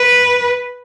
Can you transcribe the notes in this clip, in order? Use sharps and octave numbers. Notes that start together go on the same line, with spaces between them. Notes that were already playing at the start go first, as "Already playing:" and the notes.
Already playing: B4